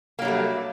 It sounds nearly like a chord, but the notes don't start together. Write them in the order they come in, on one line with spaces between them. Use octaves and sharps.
A#3 F#3 G3 A3